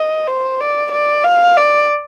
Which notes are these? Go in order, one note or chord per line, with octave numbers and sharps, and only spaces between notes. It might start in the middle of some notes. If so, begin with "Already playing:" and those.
Already playing: D#5
C5
D5
D5
F5
D5